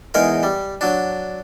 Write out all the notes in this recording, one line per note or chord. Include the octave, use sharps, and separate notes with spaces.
E2 G#3 D#4 A#4
G3
F#3 D4